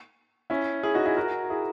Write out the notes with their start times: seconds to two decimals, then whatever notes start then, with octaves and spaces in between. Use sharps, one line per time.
0.50 C#4 E4
0.83 E4 G#4
0.94 D#4 F#4
1.05 E4 G#4
1.17 F#4 A#4
1.50 E4 G#4